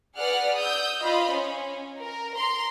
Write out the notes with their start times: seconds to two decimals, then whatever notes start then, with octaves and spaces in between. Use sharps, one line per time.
0.18 G#4 B4 D5 F#5 F6 F#6
0.57 D#6 E6 G6
1.02 F4 C5 D#5 B5 F6
1.32 C#4
2.00 A#4
2.37 A#5 C6